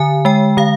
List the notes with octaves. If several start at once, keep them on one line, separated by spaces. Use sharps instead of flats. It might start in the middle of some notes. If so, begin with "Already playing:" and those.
Already playing: D3 G#5
G#3 G5
D3 F5